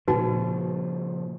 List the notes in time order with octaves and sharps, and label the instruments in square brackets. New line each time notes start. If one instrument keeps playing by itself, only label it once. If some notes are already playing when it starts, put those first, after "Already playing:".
[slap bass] A#2 C#3 F3 [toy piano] D#4 F#4 B4